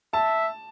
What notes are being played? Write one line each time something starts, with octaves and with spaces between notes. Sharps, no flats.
E5 A5